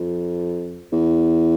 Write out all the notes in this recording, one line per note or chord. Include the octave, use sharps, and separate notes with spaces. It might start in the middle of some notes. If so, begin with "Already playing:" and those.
Already playing: F2
E2